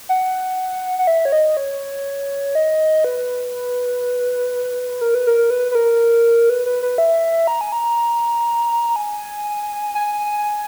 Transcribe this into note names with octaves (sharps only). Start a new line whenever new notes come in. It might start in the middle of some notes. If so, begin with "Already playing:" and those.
F#5
F#5
E5
C#5
D#5
C#5
D#5
B4
A#4
B4
A#4
B4
B4
A#4
B4
B4
B4
E5
A#5
G#5
A#5
G#5
G#5